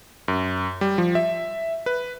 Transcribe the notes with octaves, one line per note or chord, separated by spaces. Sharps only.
F#2
G3
F3
E5
B4